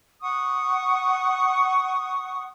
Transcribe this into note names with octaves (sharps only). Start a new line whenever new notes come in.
F#5 C#6 D#6